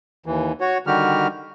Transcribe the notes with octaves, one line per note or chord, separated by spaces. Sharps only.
D#2 E3
F#4 C#5
D3 D#3 G3 F#4 G4 F6